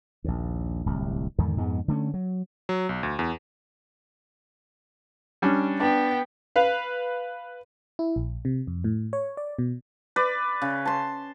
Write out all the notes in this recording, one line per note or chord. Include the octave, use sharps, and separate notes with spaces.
A#1 D#2
D1 C2
E2 G#2 D3 D#3
F2 G#2 G#3 B3
D3 A3 C4 C#4
F#3
F#3
B1
D2
E2
G3 C#4 D4
B3 D4 G5
B4 F5
E4
A#1
C3
F2
A2
C#5
D5
B2
B4 D5
C#3
A5 C6